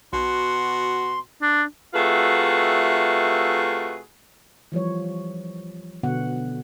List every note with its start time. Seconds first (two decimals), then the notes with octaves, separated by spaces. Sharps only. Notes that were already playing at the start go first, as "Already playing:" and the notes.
0.13 B1 B2 F#4 C6
1.42 D4
1.94 C3 A3 F4 F#4 G#4 B4
4.72 E3 F3 G3 C#5
6.03 B2 D3 B3 F#4 F#5